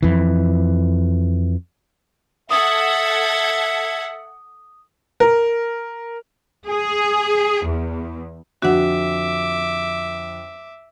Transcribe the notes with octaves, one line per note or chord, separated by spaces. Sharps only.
F2 E3
A4 E5 F#5 D#6 G#6
A#4
G#4
E2
F2 D3 F#4 E5 F#5 D6